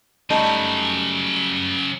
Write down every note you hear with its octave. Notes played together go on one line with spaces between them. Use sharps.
C#3 F#3 G3 A3 D#4